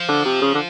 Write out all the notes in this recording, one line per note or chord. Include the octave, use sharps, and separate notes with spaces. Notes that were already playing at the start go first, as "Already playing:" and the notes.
Already playing: F3
D3
C3
C#3
D3